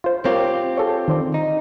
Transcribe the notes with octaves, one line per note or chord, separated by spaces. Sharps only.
F4 C5
C4 F4 G4 A#4 C#5
G#4 A4 C#5
D#3 C5 D5
D#4